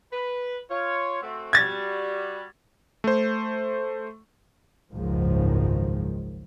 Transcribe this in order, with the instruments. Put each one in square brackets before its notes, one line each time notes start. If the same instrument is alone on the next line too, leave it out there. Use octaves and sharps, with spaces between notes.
[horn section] B4
F4 C#5
A3 C4 F#4
[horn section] G3 F#4 [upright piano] G#6 A6
[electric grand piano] A3 C5
[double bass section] F#1 C#2 G#2 D#3 F3